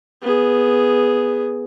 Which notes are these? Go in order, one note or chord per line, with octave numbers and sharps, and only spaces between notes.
B3 G#4